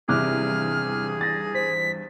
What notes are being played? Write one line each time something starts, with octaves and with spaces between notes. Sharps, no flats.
G#1 E2 G2 C3 G#4 D6 F6 F#6
A6 A#6
C5 B6